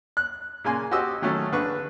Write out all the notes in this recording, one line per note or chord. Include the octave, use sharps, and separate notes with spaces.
F#6
A#2 C#3 A#3 G#5 C6
F#4 G4 C5 D#5 E6
D#3 F#3 A3 C#4
A#1 D3 B4 C#6